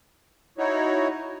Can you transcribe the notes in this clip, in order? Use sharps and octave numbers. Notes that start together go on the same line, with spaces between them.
D#4 E4 F#4 C#5